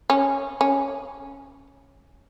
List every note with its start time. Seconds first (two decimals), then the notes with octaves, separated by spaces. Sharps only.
0.10 C#4
0.61 C#4